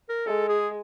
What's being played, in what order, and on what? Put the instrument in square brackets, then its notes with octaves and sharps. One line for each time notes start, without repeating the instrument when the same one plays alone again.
[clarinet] A#4
[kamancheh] G#3 [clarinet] A4
[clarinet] G#4